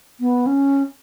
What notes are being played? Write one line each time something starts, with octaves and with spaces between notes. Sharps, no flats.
B3
C#4